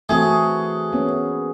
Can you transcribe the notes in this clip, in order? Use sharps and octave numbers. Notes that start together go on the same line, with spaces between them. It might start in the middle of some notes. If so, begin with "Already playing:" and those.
E3 A3 C4 F#4 G#4
A#3 B3 C#4